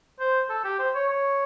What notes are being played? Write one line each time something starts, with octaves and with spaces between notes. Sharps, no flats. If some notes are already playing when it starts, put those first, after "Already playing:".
C5
A4
G4
C5
C#5
C#5